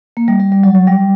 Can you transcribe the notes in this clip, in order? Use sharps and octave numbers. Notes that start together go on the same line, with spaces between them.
A#3
G3
G3
G3
F#3
F#3
G3